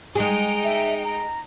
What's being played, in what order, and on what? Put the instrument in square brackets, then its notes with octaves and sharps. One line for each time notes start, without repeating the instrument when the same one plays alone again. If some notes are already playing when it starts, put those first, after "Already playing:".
[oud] G#3 G#4 [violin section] D#4 G5 D7
[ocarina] E5
A#5